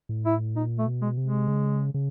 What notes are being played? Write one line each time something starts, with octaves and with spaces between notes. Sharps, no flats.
A2
E4
A#2 D#4
A3
B2
G#3
C3
G#3
C#3
C#3